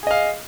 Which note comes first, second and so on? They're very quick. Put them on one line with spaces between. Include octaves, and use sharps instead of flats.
G#4 D#5 F5